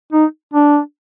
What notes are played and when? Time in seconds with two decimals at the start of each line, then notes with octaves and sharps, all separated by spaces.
0.12 D#4
0.53 D4